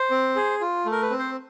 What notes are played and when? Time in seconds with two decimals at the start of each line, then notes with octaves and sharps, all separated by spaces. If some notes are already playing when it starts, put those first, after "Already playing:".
Already playing: C5
0.11 C4
0.36 G#4
0.61 F4
0.85 A3
0.92 A#4
1.02 B4
1.10 C4
1.19 C5